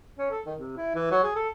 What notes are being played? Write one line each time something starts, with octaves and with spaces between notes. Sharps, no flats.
C#4
A4
D#3
C3
E4
E3
F#3
G#4
A4